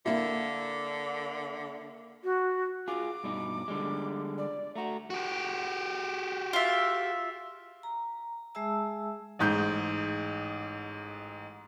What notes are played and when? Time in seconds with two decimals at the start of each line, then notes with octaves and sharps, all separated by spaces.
0.06 D3 A#3 E4
2.24 F#4
2.88 F4 G#4 D6
3.24 G2 B2 D#4
3.68 D3 G3 G#3
4.38 D5
4.76 A3 F#4 A#5
5.10 F#4 G4
6.53 F4 E5
7.83 A#5
8.55 G#3 G#4 E5 A5 E6
9.39 A1 G#2 G6